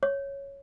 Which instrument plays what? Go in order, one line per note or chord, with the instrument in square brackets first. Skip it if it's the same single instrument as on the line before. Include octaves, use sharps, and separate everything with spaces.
[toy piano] C#5